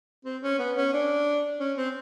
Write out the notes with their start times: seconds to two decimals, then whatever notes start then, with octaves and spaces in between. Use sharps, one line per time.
0.25 C4
0.42 C#4
0.59 B3
0.76 C#4
0.93 D4
1.60 C#4
1.77 C4